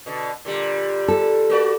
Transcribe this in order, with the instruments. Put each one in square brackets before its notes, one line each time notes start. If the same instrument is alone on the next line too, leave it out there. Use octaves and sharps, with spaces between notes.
[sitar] B2 D3
A#2 D3 G3
[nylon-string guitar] A4
[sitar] A#3 F#4 D5